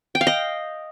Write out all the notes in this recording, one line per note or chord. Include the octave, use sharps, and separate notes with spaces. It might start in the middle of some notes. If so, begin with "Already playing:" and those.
G5
F5
D#5